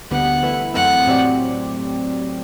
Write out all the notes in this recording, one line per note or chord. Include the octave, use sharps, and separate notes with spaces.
D2 D3 G3 B3 F#5
E3 A3 E4 B4
F#2 E3 A3 C4 F#5
A2 F#3 C4 G4 D5